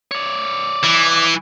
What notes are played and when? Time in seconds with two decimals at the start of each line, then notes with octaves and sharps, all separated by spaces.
0.11 C#5 D5
0.84 E3